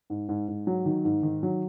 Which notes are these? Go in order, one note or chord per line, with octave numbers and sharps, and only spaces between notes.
G#2
G#2
G#2
F#3
D#3
G#2
D#3
F#3